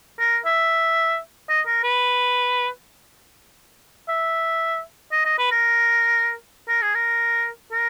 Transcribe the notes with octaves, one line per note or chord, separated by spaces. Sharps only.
A#4
E5
D#5
A#4
B4
E5
D#5
D#5
B4
A#4
A#4
G#4
A#4
A#4